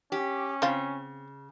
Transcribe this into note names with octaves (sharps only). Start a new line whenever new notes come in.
C#4 G4
C#3 C4 F4